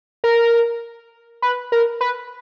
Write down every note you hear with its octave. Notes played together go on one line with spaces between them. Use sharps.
A#4
B4
A#4
B4